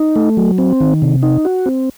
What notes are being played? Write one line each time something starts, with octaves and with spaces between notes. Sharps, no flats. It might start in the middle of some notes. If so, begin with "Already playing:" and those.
Already playing: D#4
A3
F#3
C4
D#3
C3
D#4
F#4
C4